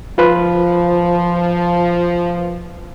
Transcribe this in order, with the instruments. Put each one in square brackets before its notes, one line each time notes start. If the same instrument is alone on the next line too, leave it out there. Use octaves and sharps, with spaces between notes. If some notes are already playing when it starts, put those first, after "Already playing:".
[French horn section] F3 [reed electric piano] F4 B4 C5